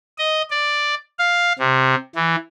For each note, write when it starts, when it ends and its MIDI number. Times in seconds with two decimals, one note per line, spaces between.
0.18 0.42 75
0.51 0.95 74
1.19 1.53 77
1.59 1.95 48
2.16 2.36 52